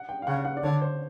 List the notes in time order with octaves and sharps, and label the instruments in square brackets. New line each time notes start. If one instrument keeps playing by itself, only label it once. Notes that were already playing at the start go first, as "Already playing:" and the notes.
Already playing: [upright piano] F#5
G5
F5
[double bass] C#3 [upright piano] F#5
[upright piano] F#5
D5
[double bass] D3 [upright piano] C#5
[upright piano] C5